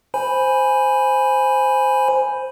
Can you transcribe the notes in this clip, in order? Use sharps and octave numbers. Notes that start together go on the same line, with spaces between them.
C5 G#5 B5